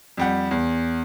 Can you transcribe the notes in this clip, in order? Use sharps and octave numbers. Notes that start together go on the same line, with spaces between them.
F2 G3 F#5
E2